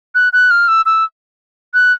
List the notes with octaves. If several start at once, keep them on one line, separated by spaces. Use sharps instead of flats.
F#6
F#6
F6
E6
E6
F#6